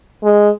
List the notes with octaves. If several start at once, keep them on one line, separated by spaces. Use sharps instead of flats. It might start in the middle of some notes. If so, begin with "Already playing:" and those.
G#3